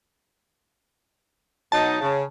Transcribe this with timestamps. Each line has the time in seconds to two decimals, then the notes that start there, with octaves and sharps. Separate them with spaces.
1.72 B2 F#3 D#4 A5
2.01 C#3